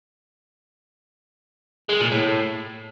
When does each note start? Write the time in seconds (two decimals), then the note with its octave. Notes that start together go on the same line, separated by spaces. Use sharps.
1.89 G#3
2.00 A#2
2.12 A2